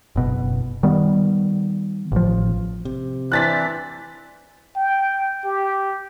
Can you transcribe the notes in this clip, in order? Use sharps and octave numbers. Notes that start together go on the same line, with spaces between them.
F#1 B2
D#3 G3 B3
A1 F3
C3
E3 C4 D4 C5 F#6 A6 B6
G5
G4